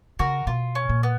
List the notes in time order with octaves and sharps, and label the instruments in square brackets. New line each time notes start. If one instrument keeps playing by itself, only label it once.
[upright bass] C#3 [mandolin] F#4 A#4
[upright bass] B2 [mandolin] F4
[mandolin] C#4
[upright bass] A#2
[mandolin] B3